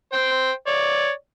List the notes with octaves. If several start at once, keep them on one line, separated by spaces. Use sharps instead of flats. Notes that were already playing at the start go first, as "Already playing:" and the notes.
C5 G5
C#5 D5